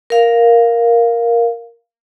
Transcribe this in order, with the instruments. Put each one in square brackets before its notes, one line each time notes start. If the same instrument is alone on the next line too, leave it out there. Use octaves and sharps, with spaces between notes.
[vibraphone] A#4 F5